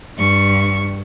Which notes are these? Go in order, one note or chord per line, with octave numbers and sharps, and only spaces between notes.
G2 C#6